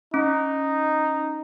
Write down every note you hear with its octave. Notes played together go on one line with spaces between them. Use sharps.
C#4 D#4